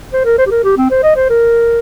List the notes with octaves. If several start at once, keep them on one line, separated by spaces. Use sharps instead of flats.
C5
A#4
C5
G4
A#4
G4
C4
C5
D#5
C5
A#4